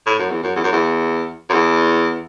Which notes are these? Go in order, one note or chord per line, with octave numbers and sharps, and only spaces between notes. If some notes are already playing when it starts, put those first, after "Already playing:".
A2
F#2
E2
F#2
E2
F#2
E2
F#2
E2